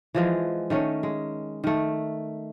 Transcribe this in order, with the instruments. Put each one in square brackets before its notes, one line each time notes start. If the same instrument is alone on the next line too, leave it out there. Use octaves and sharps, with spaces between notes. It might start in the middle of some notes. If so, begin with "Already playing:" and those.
[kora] E3 F3 G#3
D#3 A3 C#4
G#3
D#3 A3